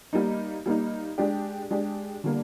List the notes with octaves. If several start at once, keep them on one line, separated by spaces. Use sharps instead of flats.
G3 A#3 D#4
G3 A#3 D#4
G#3 D4 G4
G#3 D4 G4
D3 G3 A#3